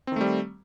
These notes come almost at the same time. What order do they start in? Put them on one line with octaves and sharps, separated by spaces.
C4 D#3 A3 G3